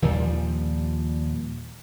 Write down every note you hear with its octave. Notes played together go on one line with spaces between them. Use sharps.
D#2 A#2 F3 G3